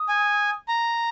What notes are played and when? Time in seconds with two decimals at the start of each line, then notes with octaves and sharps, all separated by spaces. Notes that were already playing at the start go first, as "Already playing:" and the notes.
Already playing: D#6
0.09 G#5
0.68 A#5